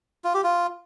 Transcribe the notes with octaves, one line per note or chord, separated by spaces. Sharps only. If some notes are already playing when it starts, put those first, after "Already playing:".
F4
G4
F4